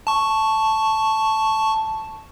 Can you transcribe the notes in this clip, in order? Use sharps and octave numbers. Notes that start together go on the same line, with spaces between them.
A5 C#6